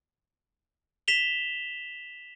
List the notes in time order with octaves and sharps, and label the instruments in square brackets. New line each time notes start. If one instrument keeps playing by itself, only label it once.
[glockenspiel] B6 E7 F7 G7